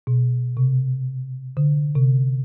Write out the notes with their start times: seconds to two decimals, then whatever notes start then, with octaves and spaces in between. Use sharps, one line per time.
0.07 B2
0.57 C3
1.57 D3
1.95 C3